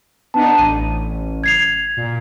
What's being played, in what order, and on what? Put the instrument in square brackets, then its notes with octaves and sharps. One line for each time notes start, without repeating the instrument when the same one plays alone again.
[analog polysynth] B3 D4 D#4 [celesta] A5
[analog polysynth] A1 [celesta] D#7
[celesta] G#6 C7 F7
[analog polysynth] A#2